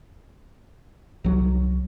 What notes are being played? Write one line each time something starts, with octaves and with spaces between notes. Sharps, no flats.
C2 F#3